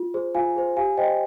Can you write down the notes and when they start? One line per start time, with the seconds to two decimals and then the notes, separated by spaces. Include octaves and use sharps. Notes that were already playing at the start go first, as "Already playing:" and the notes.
Already playing: F4
0.14 G#4 C5
0.35 F4 F5 G#5
0.56 G#4 C5
0.77 G4 F5 G#5
0.97 C5 D#5 G5